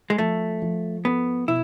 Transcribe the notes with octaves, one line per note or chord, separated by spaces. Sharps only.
G#3
F3 A3
F3
B3 A4
B2 E4